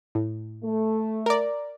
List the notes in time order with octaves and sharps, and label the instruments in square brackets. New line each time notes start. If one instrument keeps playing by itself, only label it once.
[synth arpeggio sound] A2
[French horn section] A3
[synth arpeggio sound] A#4 D5